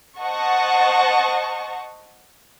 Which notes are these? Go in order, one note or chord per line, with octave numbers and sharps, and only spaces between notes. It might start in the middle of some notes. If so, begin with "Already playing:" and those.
C5 D#5 F#5 A5 C#6